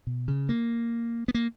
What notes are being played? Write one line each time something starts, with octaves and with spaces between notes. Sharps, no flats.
B2
C#3
A#3
B3
A#3